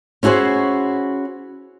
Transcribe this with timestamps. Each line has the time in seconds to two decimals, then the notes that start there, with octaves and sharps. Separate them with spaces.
0.23 C#4 E4 F#4 G#4 C5